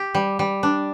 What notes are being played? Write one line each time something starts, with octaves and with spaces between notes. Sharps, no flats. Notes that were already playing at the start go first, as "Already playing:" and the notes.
Already playing: G4
G3
G3
D4